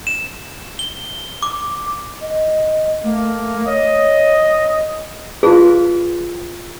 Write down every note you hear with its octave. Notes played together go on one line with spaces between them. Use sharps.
E7
G7
D6
D#5
A3 A#3
C#5 D#5
F4 G#4 B4